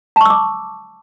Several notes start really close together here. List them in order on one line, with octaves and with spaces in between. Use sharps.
A5 C#6 E6 D6